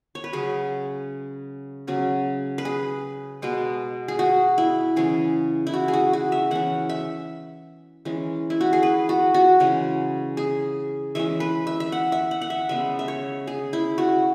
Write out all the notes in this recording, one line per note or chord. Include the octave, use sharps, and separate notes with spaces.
C#5
B4
C#3 F#3 C#4 G#4
C#3 F#3 C#4
B4
G#4
B2 G#3 B3
G#4
F#4
E4
C#3 E3 C#4 G#4
E4
F#4
G#4
F#4
F#4
E5
E3 C#4 F#5
E5
E3 G#3 C#4
E4
F#4
G#4
B4
F#4
F#4
C#3 E3 G#3
G#4
E3 G#3 C#4 E5
B4
E5
E5
F#5
E5
F#5
F#5
E5
C#3 G#3 B3 E5
E5
C#5
G#4
E4
F#4